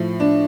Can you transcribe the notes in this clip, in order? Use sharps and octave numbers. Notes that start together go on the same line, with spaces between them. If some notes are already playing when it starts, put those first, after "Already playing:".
Already playing: A2 F3
D4